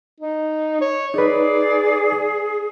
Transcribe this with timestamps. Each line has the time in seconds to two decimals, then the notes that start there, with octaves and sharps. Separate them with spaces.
0.20 D#4
0.81 C#5
1.14 D#4 G#4 B4 D5